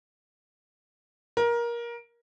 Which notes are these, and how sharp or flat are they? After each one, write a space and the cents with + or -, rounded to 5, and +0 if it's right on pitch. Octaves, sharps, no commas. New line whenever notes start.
A#4 +20